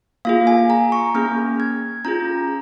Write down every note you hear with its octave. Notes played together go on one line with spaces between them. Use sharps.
A#3 F4 G#4 F5
G#5
A#5
C#6
A#3 C#4 G#4 F6
G#6
C#4 F4 G#4 A#5